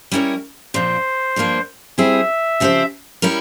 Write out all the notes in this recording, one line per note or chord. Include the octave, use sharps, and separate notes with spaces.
G3 C#4 E4 A#4 C#5
A#2 F3 C4 C5
G2 F3 A#3 F4
G3 C4 E4 G#4 E5
C#3 F3 C4 G4 C5
G3 C#4 E4 A#4